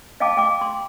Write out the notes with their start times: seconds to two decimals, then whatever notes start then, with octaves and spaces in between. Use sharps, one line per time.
0.20 D#5 F5 G5 A5 D6
0.37 G5 D6
0.61 C6